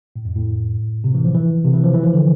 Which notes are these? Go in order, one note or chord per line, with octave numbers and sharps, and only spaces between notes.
A2
F2
A2
C3
E3
F3
E3
C3
E3
F3
E3
F3
D3